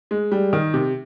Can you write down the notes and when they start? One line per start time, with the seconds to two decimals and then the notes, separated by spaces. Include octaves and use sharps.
0.11 G#3
0.32 G3
0.53 D#3
0.74 C3